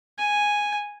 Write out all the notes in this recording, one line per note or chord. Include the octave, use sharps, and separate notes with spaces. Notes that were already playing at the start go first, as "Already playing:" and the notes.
G#5